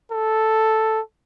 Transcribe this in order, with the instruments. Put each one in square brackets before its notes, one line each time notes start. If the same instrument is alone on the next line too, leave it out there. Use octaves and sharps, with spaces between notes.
[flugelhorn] A4